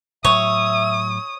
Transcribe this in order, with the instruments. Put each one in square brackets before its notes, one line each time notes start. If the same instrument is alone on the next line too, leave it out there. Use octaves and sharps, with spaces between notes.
[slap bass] A2 F#3 [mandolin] C#5 [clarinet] E5 [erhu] D#6